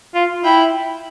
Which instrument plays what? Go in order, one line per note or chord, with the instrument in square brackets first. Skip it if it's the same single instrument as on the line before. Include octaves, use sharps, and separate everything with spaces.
[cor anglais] F4
[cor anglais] E4 [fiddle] G5